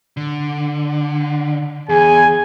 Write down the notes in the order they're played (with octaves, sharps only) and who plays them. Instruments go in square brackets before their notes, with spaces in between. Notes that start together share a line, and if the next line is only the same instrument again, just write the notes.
[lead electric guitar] D3
[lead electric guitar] E2 [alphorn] G#4 [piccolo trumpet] G#5